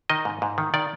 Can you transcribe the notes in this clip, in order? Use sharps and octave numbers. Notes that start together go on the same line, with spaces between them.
D#3 D#5
G#2
G#2
D#3
D#3 D5